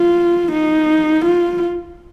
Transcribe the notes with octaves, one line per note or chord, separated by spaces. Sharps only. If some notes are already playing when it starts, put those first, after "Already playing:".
Already playing: F4
D#4
F4